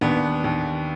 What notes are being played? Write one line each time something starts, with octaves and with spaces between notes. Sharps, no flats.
D#2 B3 D4
D#2